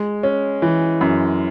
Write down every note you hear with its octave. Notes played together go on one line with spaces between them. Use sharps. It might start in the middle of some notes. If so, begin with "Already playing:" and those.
Already playing: G#3
C#4
E3
F#2